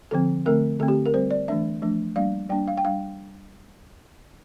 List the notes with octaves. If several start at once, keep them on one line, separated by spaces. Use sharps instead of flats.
D3 F3 C4 A4
D3 A3 C4 A#4
D3 A3 C4 A4
G4
A#4
G3 C4 C5
D5
E3 A3 D4 E5
F3 A3 D4
G3 A#3 D4 F5
G3 A#3 D4 G5
F5
G5
G3 D4 F5